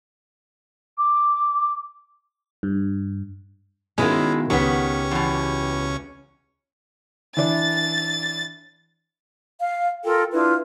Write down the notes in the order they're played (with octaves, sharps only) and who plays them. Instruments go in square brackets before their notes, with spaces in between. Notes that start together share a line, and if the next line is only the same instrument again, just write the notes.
[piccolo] D6
[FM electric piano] G2
[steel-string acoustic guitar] B2 D#3 [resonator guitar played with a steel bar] G#3 E4 F4 [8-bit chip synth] C#4
[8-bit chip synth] C#2 C#4 C#6 [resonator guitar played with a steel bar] D#3 B3 [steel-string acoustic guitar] G4
[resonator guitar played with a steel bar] E2 B2
[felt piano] E3 D4 [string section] A6
[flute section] F5
F4 A4 A#4 G5
D4 E4 F4 B4